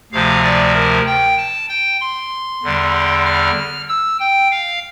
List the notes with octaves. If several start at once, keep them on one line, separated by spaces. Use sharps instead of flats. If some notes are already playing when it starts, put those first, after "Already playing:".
D2 C3 F3 F5
D5
A#4
G5
A5
G5
C6
E2 D3 G3
F6
E6
G5
F5